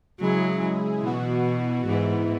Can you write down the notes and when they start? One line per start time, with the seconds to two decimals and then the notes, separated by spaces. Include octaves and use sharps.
0.21 C#3 F#3 G#3 E4 G#4
1.04 B2 E3 B3 F#4
1.87 G#2 E3 B3 E4